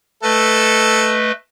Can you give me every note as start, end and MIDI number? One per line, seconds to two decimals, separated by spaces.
0.23 1.32 57
0.23 1.22 69
0.23 1.32 71
0.23 1.32 75